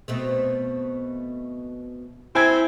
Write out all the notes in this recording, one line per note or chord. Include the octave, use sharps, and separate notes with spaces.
B2 A3 C4
C4 E4 G#5 G#6